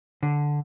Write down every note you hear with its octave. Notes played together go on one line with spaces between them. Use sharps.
D3